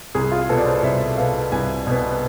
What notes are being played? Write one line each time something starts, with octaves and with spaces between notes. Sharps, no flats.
C2 G#4
F4
B2 B3 A4
D5
C5
C2 E5
B2 B3 F5
C2 G#5
B2 B3